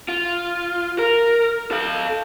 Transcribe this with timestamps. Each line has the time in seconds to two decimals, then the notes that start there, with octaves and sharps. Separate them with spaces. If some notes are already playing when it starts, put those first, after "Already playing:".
0.09 F4
0.99 A#4
1.71 A4 F5